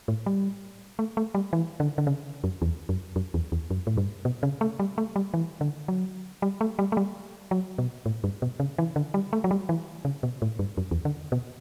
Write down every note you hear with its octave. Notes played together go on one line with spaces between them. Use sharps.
A2
G3
A3
A3
G3
E3
D3
D3
C#3
F#2
E2
F#2
F#2
E2
E2
F#2
A2
G2
B2
C#3
A3
G3
A3
G3
E3
D3
F#3
G3
A3
G3
A3
G3
F#3
B2
A2
G2
B2
C#3
E3
D3
G3
A3
F#3
G3
E3
C#3
B2
A2
G2
F#2
E2
D3
B2